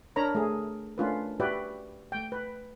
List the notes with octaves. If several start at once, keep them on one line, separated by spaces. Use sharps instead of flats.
D4 A#4 C#5 A#5 B5
A3 G#4
A3 C#4 D4 F4 A#4 B4
F#4 G4 B4 D5 E5 G5
A3 G5
B4